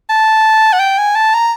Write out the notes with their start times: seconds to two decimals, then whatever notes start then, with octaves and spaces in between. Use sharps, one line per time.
0.09 A5
0.73 F#5
0.79 G5
0.98 G#5
1.15 A5
1.34 A#5